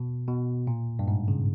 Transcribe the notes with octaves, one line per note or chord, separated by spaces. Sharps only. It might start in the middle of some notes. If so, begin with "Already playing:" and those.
Already playing: B2
B2
A#2
G2
G#2
C#3